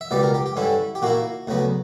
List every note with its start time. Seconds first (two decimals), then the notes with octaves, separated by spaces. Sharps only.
0.01 E5
0.11 C#2 B2 G3 B3 D5
0.23 A#4
0.34 G4
0.46 G4
0.56 G2 D3 G3 C#4 E4
0.95 G4
1.02 A#2 A#3 E4 F#4
1.47 D2 C#3 F#3 B3